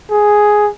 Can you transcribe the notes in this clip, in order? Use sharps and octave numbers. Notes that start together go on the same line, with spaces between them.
G#4